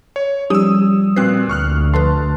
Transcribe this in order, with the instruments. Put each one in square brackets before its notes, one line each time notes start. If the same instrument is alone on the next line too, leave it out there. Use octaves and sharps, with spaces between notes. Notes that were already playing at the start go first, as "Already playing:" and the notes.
[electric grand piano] C#5
[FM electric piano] F3 G3 [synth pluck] C#4 D#4 G4 [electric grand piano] D#6 E6
[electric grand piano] A#2 F#6 C7 [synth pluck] C4 F#4 B4
[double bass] D2 [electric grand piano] C#6 F6 F#6
[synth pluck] F3 A4 B4 [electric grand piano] A5 [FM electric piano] C6